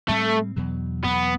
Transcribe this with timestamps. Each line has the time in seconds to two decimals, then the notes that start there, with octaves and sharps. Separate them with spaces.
0.08 A2 G3 A3 C4
0.56 E2 B2 F#3
1.04 E2 B2 F#3 B3